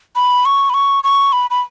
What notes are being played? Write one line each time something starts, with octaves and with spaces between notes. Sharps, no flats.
B5
C#6
B5
C#6
C#6
B5
B5